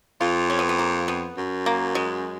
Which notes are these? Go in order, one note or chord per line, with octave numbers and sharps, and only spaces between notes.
F2 F4
C#4
B3
B3
A#3
B3
F#2
A#3
G#3